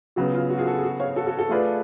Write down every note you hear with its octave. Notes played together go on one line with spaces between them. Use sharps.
C#3 F#3 B3 F#4
F4
F#4
F4 G#4
F#4 A4
G#4
F#4
C#5 F5
F#4 A4
F#4 A4
F#4 A4
A3 F4 G#4 B4 D5